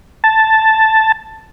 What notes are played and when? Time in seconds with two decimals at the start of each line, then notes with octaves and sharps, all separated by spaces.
0.24 A5